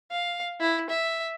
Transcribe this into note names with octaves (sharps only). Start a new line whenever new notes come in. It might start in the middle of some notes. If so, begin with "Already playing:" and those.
F5
E4
E5